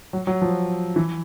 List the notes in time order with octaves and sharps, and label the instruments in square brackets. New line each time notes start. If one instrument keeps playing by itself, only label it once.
[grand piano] F#3
F#3
F3
E3